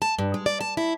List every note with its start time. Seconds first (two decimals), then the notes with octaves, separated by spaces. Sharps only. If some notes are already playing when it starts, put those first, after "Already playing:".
0.02 A5
0.19 G2
0.34 G#3
0.46 D5
0.61 A5
0.77 E4